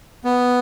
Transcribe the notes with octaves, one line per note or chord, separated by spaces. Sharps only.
B3